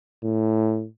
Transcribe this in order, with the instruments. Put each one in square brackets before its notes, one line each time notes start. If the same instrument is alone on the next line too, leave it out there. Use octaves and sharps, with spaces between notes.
[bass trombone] A2